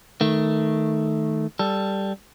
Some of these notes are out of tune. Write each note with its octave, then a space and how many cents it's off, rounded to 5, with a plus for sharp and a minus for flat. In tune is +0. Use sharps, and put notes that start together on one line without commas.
D#3 +10 A3 +0
G3 +0 A4 +0